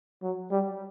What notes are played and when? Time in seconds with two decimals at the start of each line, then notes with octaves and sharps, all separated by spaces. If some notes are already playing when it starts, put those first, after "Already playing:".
0.23 F#3
0.51 G3